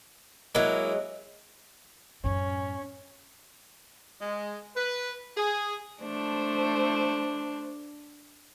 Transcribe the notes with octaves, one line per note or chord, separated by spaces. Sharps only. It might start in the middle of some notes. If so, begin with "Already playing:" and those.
F#3 G#3 A#3 E4
F#2 A2 C#4
G#3
B4
G#4
A3 D4 C5